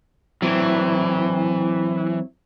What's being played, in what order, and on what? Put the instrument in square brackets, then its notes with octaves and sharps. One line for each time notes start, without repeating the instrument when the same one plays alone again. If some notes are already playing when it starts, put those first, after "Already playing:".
[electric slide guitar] E3 [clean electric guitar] F#3 C4 E4